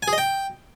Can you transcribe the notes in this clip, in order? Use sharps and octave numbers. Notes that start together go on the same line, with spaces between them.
G#5
G#4
D#5
G5